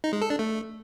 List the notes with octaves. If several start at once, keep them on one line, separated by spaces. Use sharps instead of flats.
D#4
G#3
A4
D4
A3